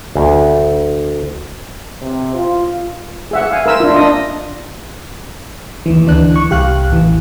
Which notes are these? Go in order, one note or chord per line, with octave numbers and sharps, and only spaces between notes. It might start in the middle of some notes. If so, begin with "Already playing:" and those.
D2
C3
F4
G#4 E5 F#5
F5 G#5
A#4 C5 E5 B5 E6
D4 F4
D4 D#5
D#2 E3
D2 E3 D4 F#6
E3 C#6
C2 G4 F5 F#6
A1 E2 E3